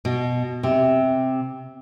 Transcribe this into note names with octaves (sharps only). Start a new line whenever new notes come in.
B2
C3